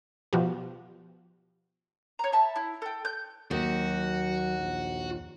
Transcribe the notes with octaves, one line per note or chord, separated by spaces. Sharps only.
B2 F3 F#4 G4
C#5 A#5
E5 A5 B5
E4
A4 G5
G6
D#2 F#3 F#4
A#1